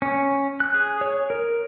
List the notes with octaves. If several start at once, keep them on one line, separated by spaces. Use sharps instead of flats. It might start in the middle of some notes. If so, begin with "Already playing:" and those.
C#4
F#6
G#4
C#5
A#4